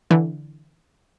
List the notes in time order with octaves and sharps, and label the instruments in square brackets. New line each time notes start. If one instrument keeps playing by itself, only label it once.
[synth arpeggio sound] D3 E3